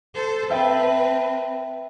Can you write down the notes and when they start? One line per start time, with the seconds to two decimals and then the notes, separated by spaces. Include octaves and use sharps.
0.14 A4 C5
0.50 C4 B4 E5 G5 A5